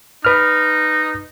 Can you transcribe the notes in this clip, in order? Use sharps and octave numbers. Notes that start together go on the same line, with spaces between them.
D#4 B4 F6